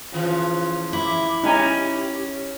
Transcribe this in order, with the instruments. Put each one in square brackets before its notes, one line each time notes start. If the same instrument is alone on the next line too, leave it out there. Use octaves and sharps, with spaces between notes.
[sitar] C#3 E3 F3 [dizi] F4
[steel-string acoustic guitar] E4 [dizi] D6
[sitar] C#4 [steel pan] D#4 G#5 [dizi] G4